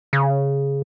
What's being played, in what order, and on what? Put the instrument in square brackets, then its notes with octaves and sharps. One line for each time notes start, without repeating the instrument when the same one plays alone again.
[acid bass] C#3